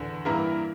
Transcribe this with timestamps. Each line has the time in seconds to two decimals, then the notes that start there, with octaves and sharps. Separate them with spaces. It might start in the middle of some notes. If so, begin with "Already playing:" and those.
Already playing: E2 D3
0.25 G2 E3 A#3 E4 A#4